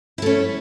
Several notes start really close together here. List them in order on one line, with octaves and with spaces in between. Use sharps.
E4 A3 C#4